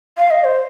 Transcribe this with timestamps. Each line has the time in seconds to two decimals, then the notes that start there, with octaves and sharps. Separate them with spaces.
0.18 F5
0.30 D#5
0.44 C5